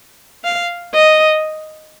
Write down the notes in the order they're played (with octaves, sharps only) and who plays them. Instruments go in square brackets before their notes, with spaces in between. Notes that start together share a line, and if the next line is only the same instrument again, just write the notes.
[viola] F5
D#5